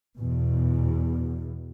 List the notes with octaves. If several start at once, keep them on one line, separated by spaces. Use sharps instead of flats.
E2 B2